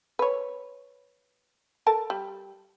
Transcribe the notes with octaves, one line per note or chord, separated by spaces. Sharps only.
B4 C#5
A4 A#4 A5
G3